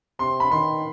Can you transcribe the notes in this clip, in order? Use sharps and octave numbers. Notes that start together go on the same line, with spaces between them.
C3 C6
B5
D#3 C6